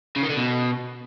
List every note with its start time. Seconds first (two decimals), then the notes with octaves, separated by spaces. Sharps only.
0.16 C#3
0.23 D#3
0.30 D3
0.36 B2